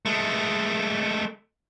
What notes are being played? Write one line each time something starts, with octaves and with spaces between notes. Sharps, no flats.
G#3 A3